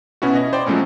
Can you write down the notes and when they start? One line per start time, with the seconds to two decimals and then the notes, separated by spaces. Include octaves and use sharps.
0.22 B2 B3 C#4 E4 F#4
0.35 E4 D#5
0.53 C5 D5 G5
0.66 F3 F#3 G#3 A3 C4 C#4